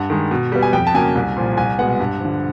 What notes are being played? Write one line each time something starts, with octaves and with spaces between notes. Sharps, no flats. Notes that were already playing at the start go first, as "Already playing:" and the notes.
Already playing: G2 F#5
D#3 G#3
B2
G3 B3
G#5
F2 G5
A5
C#3 F#3 A#3 G#5
C2
A#2 F3
C2 G#5
B2 G#3 B3 F#5
G2
D3 F3